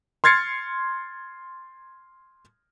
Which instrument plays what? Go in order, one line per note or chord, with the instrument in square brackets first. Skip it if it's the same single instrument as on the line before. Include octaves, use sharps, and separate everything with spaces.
[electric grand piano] C6 F6 G#6 A6 C7 C#7